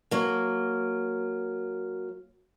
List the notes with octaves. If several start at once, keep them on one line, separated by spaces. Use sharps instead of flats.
F#3 A#3